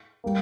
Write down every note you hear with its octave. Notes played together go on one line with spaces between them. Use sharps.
G3 A#3